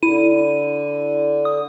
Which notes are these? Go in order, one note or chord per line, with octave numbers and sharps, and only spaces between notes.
D3 E4 D#7
D#6